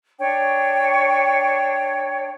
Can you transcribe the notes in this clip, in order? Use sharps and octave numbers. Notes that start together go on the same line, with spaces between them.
D4 C#5 G5